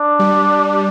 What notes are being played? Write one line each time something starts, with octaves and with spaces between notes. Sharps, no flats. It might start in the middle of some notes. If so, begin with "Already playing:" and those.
Already playing: D4
G3